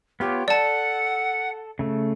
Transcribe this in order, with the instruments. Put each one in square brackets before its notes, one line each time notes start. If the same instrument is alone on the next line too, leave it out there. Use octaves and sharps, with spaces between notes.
[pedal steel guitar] B3 F4 C#5 [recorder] G4
[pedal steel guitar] A4 [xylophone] D5 A5 [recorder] F#5
[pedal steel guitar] C#3 A3